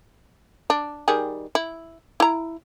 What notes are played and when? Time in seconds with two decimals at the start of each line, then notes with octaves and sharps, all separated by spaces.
0.70 D4
1.08 D#3 G3 G#4
1.55 E4
2.20 E4 A#5